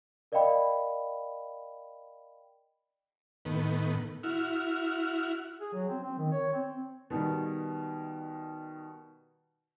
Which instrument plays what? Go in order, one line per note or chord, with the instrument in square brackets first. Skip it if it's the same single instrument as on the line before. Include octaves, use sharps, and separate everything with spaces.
[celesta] A#4 D5 D#5 F5 G5 B5
[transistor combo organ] A2 D#3 B3
E4 F#4 F6
[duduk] G#4
F#3
C4
C4
D#3
C#5
C4
[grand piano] B2 D#3 G3